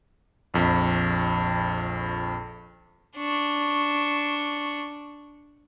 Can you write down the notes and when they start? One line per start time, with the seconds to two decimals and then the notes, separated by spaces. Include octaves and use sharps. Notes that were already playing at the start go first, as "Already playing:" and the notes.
0.54 A#1 F2 B5
3.17 D4 C#6